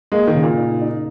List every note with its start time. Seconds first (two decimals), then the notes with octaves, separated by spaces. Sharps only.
0.12 G#3 A#3
0.27 D#3
0.35 C#3
0.43 A#2
0.57 D#4
0.81 D#4